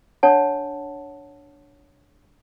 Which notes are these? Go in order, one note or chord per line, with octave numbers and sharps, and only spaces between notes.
D4 C#5 F#5 A5